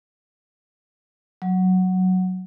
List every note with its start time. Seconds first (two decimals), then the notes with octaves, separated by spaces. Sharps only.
1.42 F#3